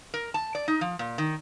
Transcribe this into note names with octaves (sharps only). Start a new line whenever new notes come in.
A#4
A5
D5
D#4
F3
A#2
D#3